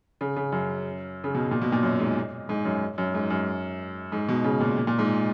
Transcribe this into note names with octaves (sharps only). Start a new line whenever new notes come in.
C#3
C#3
F#2
C#3
B2
A#2
B2
A#2
F#2
G#2
G#2
F#2
F#2
G#2
F#2
G#2
B2
C#3
A#2
A#2
A#2
G#2